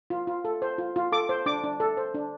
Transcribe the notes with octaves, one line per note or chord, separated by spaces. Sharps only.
F4
F4
A4
C5
F4
F4
A4 D6
C5
D4 D6
D4
A4
C5
D4